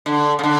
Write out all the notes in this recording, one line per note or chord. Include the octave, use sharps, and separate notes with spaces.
D3
C#3
D3